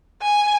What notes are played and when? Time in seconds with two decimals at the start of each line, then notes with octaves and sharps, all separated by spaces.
0.22 G#5